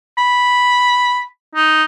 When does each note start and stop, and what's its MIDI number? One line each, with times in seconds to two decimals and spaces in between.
0.18 1.24 83
1.55 1.84 63